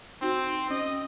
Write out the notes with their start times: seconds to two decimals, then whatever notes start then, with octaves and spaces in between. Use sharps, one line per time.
0.22 C4 D#4 F#4
0.70 C#4 D#5